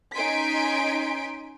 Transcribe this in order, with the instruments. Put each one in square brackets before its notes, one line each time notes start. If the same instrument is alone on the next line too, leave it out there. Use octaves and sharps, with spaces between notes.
[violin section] C#4 D#4 G#5 C6 B6 D7